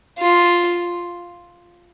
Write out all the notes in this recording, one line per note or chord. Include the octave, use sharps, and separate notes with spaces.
F4